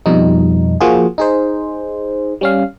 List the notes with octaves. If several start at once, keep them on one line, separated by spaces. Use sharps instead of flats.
F2 B2 F3 G3 D#4
F3 A#3 F4 F#4 G#4
D#4 G#4 C5
G3 C#4 F5